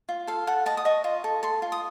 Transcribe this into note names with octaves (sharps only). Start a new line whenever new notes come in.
F4
A4 F5
A4 F#5
D#5 A5
D#6
D#5 C#6
F4
A4
A4 C6
F4
D#6